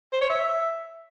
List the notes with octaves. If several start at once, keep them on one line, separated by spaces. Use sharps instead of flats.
C5
C#5
E5